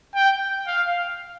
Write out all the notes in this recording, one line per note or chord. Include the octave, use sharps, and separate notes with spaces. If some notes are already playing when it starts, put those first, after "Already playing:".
G5
F5